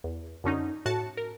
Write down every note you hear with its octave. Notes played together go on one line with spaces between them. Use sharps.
E2
F#2 D3 C#4 D#4
A2 F#4 A5 C#7
A#4